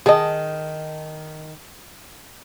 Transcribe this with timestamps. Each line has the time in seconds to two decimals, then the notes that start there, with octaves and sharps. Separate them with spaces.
0.06 D#3 G#4 D#5 A5